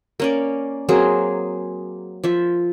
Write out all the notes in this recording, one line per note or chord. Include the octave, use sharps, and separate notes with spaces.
A#3 C#4 D5
F#3 A#3 C4 G#4
F3 E5